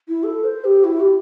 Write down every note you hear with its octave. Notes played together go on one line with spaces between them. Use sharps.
E4
A4
C5
G4
E4
G4